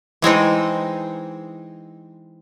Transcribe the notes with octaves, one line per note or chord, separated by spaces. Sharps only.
E3 G#3 C4 D#4